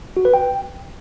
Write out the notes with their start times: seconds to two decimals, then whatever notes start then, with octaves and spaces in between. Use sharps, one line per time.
0.17 F#4
0.25 B4
0.34 G5